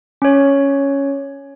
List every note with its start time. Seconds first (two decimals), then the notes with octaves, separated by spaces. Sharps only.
0.22 C#4 C#5